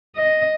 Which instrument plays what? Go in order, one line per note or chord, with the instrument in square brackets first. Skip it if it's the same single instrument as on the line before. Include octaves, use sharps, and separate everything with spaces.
[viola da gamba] D#5